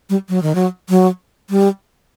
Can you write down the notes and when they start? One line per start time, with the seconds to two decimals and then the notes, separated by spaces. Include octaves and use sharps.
0.10 G3
0.29 F#3
0.43 D#3
0.55 F#3
0.89 F#3
1.50 G3